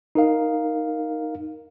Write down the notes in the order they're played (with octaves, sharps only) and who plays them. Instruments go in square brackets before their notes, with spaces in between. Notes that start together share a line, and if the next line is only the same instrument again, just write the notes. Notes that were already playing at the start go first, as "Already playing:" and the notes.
[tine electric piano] D#4 A#4 F5